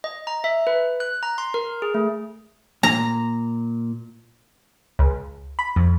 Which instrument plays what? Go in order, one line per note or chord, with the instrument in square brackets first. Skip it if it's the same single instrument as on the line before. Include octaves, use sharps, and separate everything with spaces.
[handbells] D#5
A#5
E5
B4
F#6
A#5
C6
A#4
G#4
A3
[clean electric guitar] A#2 [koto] A#5
[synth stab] C#2
B5
F2